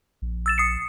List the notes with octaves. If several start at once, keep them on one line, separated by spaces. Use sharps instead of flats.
A#1
E6 A6 E7
D#6 C7 C#7